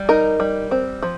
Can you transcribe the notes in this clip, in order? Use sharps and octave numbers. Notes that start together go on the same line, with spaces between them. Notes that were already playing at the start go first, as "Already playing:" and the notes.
Already playing: G3
D#4 A#4
G3
C4
F3